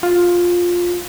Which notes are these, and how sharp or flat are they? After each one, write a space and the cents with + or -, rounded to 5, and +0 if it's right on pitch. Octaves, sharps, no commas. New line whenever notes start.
F4 +10